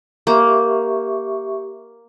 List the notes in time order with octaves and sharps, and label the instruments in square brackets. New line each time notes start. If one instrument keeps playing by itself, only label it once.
[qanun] A#3 [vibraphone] G4 E5 C#6